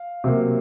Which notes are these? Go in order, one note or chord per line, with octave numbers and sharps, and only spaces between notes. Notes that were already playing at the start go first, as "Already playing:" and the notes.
Already playing: F5
C3 F#3 A#3